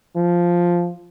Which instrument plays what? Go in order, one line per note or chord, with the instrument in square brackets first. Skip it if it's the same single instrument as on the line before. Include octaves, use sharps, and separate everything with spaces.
[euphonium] F3